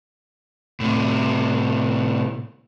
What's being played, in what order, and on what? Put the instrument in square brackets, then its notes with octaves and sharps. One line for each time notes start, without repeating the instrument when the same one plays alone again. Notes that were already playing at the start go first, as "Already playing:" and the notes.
[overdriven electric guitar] A2 C3